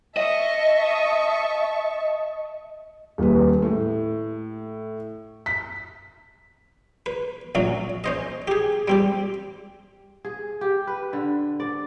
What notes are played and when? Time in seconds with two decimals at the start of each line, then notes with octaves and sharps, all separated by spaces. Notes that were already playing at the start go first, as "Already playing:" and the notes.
0.17 D#5 E5 A5 C#6
3.18 D#1 A#2 B4
3.62 A2
5.46 B6
7.06 B4
7.55 A#1 F#2 F#3 C#4
8.04 C#4 C5 D#5
8.48 G4 G#4
8.88 G3 C4 G4
10.25 G#4
10.61 G4
10.87 B4
11.13 D3
11.60 D5